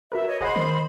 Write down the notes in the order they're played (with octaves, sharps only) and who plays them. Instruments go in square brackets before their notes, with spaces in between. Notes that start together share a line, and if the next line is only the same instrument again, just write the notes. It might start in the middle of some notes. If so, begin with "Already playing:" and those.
[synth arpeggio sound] F#4 A#4 B4 [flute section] E5
[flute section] C#5 D#5
[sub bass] E1 [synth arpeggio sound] G#4 D#5 F#5 [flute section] C5 B5
[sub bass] D#3 [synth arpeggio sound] A#4 D#5